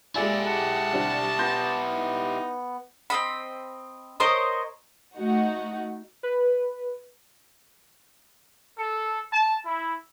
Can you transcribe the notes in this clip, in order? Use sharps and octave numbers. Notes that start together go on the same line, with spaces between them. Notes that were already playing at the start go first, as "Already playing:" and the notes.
G#3 A#3 E4 G4 A4 D5 G#5 E6
F#5 A5
D3 G3 C4
B3 C6 G6 A#6
D#4
C4 D#5 B5
A#4 C5 C#5 D#5
A3 D#4 F#4
B4
A4
A5
E4